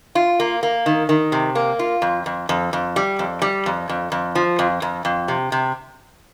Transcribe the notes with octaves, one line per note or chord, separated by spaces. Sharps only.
F4
A#3
A#3
D#3
D#3
C3
A#3
F4
F2
F2
F2
F2
G3
F2
G3
F2
F2
F2
F3
F2
F2
F2
C3
C3